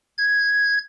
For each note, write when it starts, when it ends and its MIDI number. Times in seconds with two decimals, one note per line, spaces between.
0.18 0.78 92